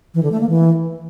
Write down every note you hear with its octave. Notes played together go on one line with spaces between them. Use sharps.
E3
D3
A3
A#3
E3